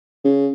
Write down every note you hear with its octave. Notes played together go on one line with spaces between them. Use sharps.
C#3